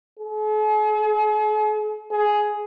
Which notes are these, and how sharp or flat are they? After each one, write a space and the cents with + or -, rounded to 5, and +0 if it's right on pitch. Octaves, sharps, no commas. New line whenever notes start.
G#4 +45
G#4 +10